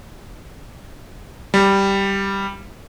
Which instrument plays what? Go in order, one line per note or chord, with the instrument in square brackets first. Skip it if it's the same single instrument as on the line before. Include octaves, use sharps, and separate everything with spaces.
[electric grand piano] G3